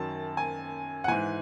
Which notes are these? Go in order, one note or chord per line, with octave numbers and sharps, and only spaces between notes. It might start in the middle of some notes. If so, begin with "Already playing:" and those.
Already playing: F#2 D#3 F#3 A5
G#5
F#5
G#2 E3 G#5